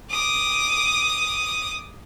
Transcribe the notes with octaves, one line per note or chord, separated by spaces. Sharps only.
D6 D#6